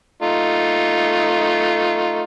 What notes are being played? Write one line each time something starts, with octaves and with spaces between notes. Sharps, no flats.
A3 D#4 F4